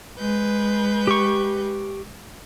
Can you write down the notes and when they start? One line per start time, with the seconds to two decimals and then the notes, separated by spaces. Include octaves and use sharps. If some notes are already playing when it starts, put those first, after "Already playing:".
0.18 G#3 B4 G6
1.07 G4 C#6